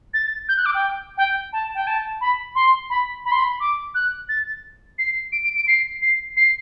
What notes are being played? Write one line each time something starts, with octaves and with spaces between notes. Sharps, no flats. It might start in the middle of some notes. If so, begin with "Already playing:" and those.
A6
G6
F#6
D6
G5
G5
A5
G5
A5
B5
C6
B5
B5
C6
B5
D6
F#6
A6
C7
D7
D7
D7
C7
C7
C7